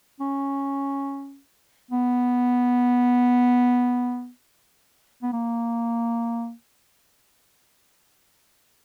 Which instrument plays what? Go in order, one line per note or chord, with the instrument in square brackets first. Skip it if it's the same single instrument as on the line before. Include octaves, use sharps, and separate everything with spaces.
[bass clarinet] C#4
B3
B3
A#3